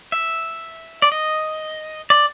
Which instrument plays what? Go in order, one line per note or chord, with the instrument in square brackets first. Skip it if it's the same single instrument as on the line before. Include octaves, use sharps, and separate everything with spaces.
[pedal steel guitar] E5
D5
D#5
D5